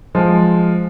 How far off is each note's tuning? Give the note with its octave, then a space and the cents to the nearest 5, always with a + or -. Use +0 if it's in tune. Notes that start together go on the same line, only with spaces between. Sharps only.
F3 +0 G#3 +5